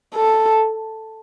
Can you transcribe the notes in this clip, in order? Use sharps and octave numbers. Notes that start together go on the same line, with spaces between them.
A4